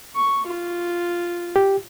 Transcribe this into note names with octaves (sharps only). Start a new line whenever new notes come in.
C#6
F4
G4